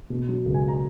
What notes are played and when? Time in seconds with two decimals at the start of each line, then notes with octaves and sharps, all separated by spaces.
0.10 B2
0.29 F#3
0.46 C#2
0.54 G#5
0.68 A#5